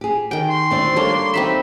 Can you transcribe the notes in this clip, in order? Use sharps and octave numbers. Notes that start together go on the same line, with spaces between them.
G4 G#4
D#3 G5
C6
D2 C4 D5
G3 A#3 D4 A4 C#5
C4 D#4 E5 B5